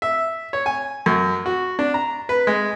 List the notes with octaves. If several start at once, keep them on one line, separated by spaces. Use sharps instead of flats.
E5
C#5
G#5
F#2
F#4
D4
A#5
B4
G#3